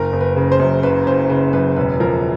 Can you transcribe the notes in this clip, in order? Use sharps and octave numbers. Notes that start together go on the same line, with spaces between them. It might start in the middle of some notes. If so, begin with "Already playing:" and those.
Already playing: F#1 A#4
F#1
B4
C#3
C5
F#2
F#1 B4
F#1 C5
C#3 B4
F#2 B4
E1 B4
F3 A#4